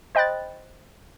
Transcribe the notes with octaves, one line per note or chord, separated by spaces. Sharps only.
C5 D#5 G5 B5 F#6 A6